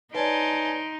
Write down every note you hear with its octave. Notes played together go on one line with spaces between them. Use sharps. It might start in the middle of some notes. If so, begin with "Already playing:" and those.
D#4 B4 C#5 D5 G#5 A5 C6 D7